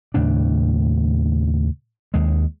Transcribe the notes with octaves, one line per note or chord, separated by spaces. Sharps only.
D#2 A2 C#3 D4
D#2 G#3